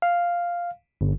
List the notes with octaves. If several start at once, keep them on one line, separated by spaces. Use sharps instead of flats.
F5
G1